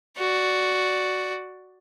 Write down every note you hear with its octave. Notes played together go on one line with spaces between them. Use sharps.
F#4 D5